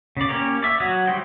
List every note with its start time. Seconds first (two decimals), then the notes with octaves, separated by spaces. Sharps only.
0.17 C#3 D5
0.29 A#3 C#4 G4 A#4 C#5
0.63 D5 E5
0.80 F#3 F#4 C#5 D#6
1.07 G3 E4 C5 G5